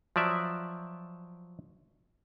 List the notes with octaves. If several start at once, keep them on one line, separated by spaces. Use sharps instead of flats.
F3 F#3 D5 E5